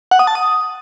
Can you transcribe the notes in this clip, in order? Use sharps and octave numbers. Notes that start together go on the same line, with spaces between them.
F#5
D#6
A5
D#6